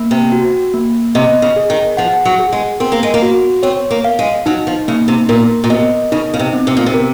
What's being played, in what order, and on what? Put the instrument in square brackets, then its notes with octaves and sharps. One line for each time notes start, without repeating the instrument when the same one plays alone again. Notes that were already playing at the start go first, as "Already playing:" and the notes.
Already playing: [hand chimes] A#3
[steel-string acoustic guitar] C3
[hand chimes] F#4
A#3
[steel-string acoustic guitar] C3 [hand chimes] D#5
[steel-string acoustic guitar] C#3
[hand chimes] G#4
[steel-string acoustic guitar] D#3
[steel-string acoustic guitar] F3 [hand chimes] F#5
[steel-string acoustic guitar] F#3
[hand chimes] G#4
[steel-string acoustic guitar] G#3
[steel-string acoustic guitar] C4 [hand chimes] A#4
[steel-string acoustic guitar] A#3
G#3
A#3
[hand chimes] F#4
[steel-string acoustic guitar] C4 [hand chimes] C#5
[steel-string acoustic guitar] A#3
[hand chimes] F5
[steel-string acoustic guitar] G#3
[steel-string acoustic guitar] F#3 [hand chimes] D#4
[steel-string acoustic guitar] F3
[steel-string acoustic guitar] C#3 [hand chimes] A#3
[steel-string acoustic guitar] C3
[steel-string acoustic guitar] A#2 [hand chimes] A#4
[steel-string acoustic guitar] A#2
[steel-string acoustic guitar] C3 [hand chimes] D#5
[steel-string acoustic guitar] C#3 [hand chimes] D#4
[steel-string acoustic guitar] C#3
C3
[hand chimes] C4
[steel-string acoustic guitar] C3
A#2
C3
[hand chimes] A#4